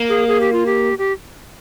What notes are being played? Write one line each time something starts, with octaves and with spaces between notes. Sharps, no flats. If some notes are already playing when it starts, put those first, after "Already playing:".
Already playing: A#3
G#4
G#4
G4
F4
G4
G4